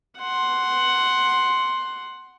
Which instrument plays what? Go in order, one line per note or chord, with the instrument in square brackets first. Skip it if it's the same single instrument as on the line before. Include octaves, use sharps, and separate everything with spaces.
[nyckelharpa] F#5 C6